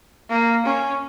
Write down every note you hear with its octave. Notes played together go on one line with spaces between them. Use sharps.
A#3
C#4